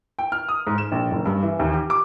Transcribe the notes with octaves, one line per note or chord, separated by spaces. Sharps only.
G5
F6
D#6
G#2
E7
A#1
F#1
G2
E3
D#2
G4
D6